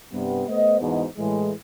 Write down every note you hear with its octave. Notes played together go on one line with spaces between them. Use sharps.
G2 C3 G3 B3
A3 B3 C5 D#5
E2 G#2 B2
A2 E3 G#3